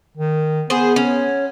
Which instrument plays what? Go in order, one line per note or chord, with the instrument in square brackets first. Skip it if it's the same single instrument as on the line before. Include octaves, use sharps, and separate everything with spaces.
[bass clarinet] D#3
[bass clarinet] B3 [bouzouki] G#4 C5
[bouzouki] C#4